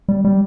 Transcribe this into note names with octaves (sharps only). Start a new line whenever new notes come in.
G3
G3